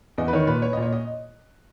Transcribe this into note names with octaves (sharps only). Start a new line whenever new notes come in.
E2 D#5
B4
D#3 C#5
A#2 B4
C#5
A#2 D#5
C#5
D#5